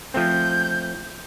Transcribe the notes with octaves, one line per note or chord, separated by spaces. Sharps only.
F3 A3 C4 G6